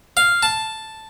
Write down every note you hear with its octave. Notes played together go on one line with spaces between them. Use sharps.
F5
A5